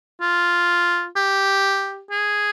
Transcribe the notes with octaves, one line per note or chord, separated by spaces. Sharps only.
F4
G4
G#4